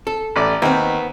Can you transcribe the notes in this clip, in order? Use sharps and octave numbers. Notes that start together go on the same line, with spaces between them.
A4
A1 D5
D#2 B3 C4